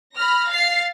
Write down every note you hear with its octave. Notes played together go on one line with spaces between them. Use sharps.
B5 F6 A#6
F5 A6 C7